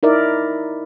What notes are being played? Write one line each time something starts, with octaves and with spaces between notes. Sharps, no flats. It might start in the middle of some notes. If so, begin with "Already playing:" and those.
D#4 E4 A#4 D5 E5